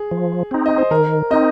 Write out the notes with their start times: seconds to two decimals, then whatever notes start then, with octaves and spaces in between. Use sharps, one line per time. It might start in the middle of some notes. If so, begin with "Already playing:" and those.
Already playing: G#4
0.11 F3
0.51 C4 D#4
0.66 D#5
0.78 C5
0.91 D#3 A#4
1.31 C4 D#4 D#5